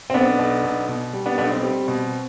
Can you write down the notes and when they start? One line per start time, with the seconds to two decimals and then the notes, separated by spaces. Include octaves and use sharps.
0.10 C4
0.14 B1 B3 D4
0.39 B1
0.64 B1
0.88 B2
1.13 G3
1.26 B3 D4
1.38 B1 B3 D4
1.51 C4
1.63 G3
1.88 B2